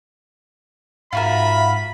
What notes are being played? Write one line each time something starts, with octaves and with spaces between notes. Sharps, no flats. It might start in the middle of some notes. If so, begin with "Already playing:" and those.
G#2 F4 F#4 A#4 E5 B5